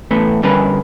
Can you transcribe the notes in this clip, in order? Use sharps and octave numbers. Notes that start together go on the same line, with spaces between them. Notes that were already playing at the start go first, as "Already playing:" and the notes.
A2 E3 A3 B3
D3 G3 C#4 A#4 B4